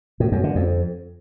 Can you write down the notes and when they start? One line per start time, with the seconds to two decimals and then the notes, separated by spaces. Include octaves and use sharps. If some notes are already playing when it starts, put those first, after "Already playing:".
0.20 A2
0.32 F#2
0.44 D3
0.55 F2